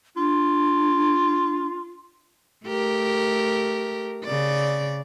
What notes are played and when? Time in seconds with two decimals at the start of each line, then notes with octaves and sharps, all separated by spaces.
0.16 D4 F4
2.66 A3 G4 A#4
4.24 C#3 D5